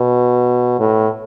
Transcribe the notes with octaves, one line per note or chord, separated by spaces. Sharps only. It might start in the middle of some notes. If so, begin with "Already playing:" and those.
Already playing: B2
A2